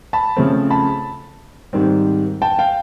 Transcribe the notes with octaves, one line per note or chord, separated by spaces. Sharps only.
A5 B5
C#3 F3 A3 C4
A5 B5
G#2 D#3 G3 C4
G5 A5
F5 G5